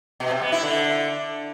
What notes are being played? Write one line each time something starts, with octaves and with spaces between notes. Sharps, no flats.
B2
C3
B3
E4
D3